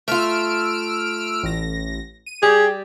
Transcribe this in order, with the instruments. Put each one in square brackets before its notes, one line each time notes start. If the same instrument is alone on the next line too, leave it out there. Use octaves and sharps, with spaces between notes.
[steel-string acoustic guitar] A3 F4 [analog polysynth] E6 F6 D7
[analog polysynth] A1 A#6
D#7
[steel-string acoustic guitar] G3 [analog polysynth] G4 [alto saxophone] G#4